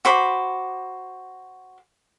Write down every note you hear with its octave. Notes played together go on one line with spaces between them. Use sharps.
F#4 C5 B5 D6